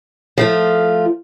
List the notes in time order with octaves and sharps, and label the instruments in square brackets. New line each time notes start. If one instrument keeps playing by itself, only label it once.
[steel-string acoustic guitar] F3 A3 F4